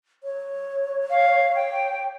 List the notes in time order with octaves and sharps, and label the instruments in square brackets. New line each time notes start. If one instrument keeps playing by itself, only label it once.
[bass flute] C#5
[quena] F5
G5